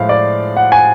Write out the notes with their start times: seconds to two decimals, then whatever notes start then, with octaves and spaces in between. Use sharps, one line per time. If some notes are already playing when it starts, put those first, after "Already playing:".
Already playing: A2 F3 G#3 F5
0.09 D5
0.57 F#5
0.72 G#5